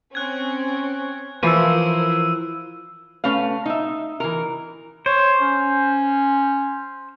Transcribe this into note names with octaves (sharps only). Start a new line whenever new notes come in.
C4 C#4 F#6 G#6
E3 F3 E4 A#4 C5 E6 D#7
A3 C#4 B4 F5
D#4 E5
E3 A#4
C5 C#5
C#4